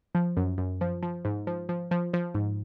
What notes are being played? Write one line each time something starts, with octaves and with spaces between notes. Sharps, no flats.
F3
F#2
F#2
F3
F3
G#2
F3
F3
F3
F3
G#2